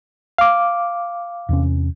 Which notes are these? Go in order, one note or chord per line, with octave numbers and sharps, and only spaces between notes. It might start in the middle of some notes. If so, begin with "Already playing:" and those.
F5 D6
E2 C3 C#4